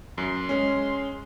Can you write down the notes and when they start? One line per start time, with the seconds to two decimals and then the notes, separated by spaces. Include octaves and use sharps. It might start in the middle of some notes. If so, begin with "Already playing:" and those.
0.18 F#2 C6
0.49 G#3 C#4